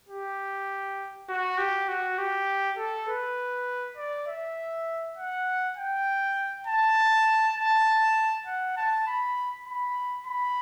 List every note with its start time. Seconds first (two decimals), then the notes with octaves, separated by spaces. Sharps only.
0.08 G4
1.29 F#4
1.58 G4
1.88 F#4
2.18 G4
2.77 A4
3.08 B4
3.97 D5
4.27 E5
5.17 F#5
5.77 G5
6.67 A5
7.57 A5
8.46 F#5
8.77 A5
9.07 B5
9.66 B5
10.26 B5